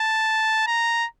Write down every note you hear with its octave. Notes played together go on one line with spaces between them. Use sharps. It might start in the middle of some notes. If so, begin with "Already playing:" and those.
Already playing: A5
A#5